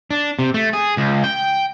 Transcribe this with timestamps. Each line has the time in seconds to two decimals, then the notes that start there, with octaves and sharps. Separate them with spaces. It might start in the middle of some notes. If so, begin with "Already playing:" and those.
0.11 D4
0.39 C3
0.54 A3
0.73 G#4
0.97 C#2
1.24 G5